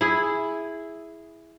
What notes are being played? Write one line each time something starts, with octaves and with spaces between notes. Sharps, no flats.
E4 G#4